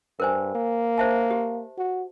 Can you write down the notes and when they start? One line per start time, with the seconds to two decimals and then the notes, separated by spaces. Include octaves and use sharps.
0.20 G2 A#4 C5 G#5
0.55 A#3
0.98 C5 E5 A5
1.31 G4
1.78 F#4